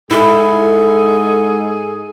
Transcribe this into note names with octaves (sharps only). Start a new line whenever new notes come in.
G#2 E4 G#4 A4